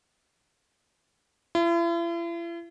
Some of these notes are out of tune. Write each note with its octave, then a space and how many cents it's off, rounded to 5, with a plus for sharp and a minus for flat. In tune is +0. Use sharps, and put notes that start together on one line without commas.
E4 +45